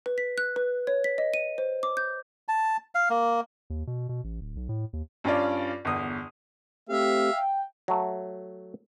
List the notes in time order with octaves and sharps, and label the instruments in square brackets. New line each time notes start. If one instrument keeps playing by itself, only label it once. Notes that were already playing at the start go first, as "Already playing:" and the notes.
[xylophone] B4
B6
F#6
B4
C#5
B6
D#5
D#7
C5
D6
G6
[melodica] A5
F5
A#3
[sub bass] D#2
B2
B2
A1
D1
B1
A2
D#2
[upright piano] G2 C#4 F4 D5
G1 E2 D#6
[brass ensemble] A3 C4 G4 [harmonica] E5 F5
[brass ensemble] G5
[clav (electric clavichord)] F#3 A3